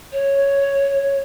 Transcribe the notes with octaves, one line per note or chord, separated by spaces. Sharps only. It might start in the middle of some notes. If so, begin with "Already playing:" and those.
C#5